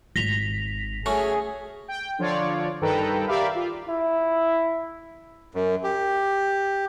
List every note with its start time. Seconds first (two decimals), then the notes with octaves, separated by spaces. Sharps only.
0.16 G#1 A#6 B6 F7
1.06 A3 C#4 F#4 G#4
1.88 G5
2.19 D3 F3 F4 C#5 D5
2.81 G2 D#3 A4 B4 G5 A#5
3.27 G4 A#4 D5 E5 F5 B5
3.55 F4
3.89 E4
5.55 F#2
5.84 G4